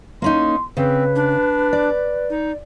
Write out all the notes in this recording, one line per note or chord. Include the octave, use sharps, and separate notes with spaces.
A#3 C#4 D#4 C6
C#3 C4 B4
D4
D5
D#4